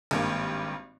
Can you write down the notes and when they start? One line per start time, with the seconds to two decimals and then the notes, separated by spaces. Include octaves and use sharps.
0.11 G#1 G2 A#3